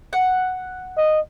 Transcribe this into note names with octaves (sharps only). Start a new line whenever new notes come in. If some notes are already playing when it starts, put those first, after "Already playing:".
F#5
D#5